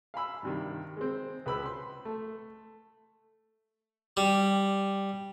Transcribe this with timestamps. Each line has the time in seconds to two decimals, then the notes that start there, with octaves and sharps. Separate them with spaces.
0.14 F5 G#5 B5 E6
0.43 G2 C3 D#3
0.97 G#3 C4
1.46 C#2 B4 B5 E6
1.65 C6
2.05 A3
4.17 G3